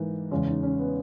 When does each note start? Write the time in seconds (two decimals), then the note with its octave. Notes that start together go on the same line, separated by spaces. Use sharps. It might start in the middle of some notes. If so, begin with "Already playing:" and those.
Already playing: G#2 E3 A#3 D#4
0.31 E2 C#3 G#3 C#4
0.47 D#4
0.63 C#4
0.79 B3